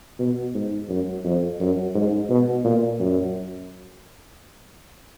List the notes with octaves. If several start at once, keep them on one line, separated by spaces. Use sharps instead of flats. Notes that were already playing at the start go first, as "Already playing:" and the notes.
B2
G#2
F#2
F2
F#2
G#2
B2
A#2
F#2